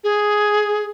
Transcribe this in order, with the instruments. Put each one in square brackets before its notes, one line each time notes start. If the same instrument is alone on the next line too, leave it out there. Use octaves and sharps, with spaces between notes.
[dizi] G#4